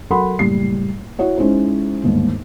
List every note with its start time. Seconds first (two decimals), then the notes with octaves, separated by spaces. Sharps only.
0.10 F#3 A4 A#4 F#5 B5 C6
0.39 F#1 A2 G3 C7
1.19 E4 F#4 C#5 F#5
1.38 G#3 C#4 D#4 E4 C5
2.04 G1 D#2 G#2